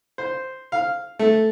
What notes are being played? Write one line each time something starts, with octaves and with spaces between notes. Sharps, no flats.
C5
F5
A3